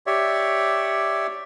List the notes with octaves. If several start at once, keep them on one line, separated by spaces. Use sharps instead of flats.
G4 C#5 D5 E5